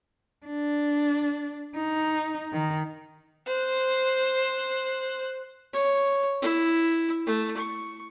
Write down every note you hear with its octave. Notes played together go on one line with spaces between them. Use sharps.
D4
D#4
D#3
C5 F#6
C#5
E4
A3
C#6